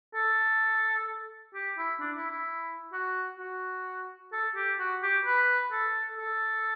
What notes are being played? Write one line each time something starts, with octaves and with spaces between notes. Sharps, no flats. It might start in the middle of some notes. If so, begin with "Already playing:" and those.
A4
G4
E4
D4
E4
E4
F#4
F#4
A4
G4
F#4
G4
B4
A4
A4